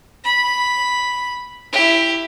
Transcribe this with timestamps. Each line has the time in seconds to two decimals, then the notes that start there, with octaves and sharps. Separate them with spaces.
0.24 B5
1.73 E4 G4